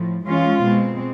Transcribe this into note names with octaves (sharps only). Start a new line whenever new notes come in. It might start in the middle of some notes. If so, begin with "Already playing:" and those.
Already playing: A2 F3
E3 G#3 C#4 F4
B2 G#3 C4